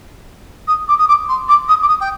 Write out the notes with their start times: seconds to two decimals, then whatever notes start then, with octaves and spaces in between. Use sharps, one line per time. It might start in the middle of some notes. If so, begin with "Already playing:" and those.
0.67 D#6
0.88 D6
0.98 D#6
1.08 D6
1.28 C6
1.48 D6
1.68 D#6
1.82 D6
1.88 D#6
2.00 G5